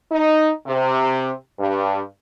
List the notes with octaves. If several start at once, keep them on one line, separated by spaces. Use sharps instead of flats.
D#4
C3
G2